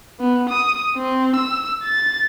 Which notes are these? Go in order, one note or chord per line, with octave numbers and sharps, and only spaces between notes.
B3
D#6
C4
E6
A6